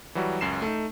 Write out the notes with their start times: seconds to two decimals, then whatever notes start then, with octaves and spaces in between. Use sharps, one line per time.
0.15 E3 F#3 G3 F#4
0.41 C#2 F#2 C7 E7
0.62 A3 D#4